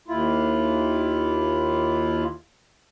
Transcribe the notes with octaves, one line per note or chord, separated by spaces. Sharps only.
D#2 E4 F4